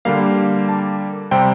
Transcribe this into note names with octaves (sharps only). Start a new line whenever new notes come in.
D3 G3 A#3 F5
A5
C3 G3 C4 G5